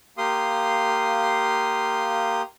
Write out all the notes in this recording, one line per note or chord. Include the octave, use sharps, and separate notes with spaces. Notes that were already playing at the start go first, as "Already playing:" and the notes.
A#3 G4 F5 C6 D#6